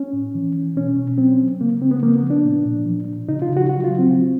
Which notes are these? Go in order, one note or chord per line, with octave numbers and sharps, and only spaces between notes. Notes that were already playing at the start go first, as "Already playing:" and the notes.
Already playing: C#4
A2
E3
E3
B2 C#4
B2
F#3 C4
F#3
C#3 A#3
C#3 C4
B3
F3 A#3
B3
F3
D4
A#2
A#2
F3
F3
C#3 D#4
F4
C#3
F#4
F#3 F#4
F4
F#3
C4
C#3